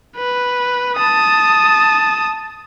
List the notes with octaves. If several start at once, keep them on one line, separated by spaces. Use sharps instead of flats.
B4
A5 D#6